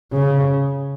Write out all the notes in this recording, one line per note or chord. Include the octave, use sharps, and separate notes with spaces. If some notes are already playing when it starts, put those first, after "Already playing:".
C#3